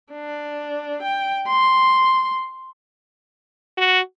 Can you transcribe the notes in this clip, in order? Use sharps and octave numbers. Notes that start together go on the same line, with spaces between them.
D4
G5
C6
F#4